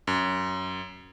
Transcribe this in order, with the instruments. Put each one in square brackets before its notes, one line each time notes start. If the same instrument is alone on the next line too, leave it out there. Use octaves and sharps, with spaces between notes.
[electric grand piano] F#2